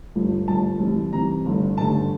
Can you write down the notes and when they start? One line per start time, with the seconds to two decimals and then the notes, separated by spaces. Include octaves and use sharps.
0.15 G1 G2 F3 A3
0.48 G1 G2 F3 A3 A5
0.80 C2 C3 E3
1.13 C2 C3 E3 A#5
1.45 G1 G2 D3 A3
1.77 G1 G2 D3 A3 A5